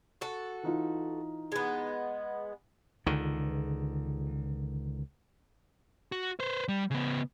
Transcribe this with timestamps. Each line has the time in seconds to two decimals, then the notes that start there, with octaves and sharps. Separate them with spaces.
0.21 F#4 A4
0.63 E3 D#4 F4
1.52 G#3 B3
3.06 C#2 D3 D#3
6.12 F#4
6.40 B4 C5
6.68 G3
6.91 C#3 B3